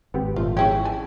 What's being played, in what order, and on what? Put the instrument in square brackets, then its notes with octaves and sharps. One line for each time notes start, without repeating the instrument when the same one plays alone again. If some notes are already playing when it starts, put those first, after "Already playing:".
[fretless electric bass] G#1 [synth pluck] B3 C4 G4
[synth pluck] A#2 F3 A3 [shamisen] F4
[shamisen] C#4 E4 G4 [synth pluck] G#4 C#5
[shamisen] G#5 [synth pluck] A5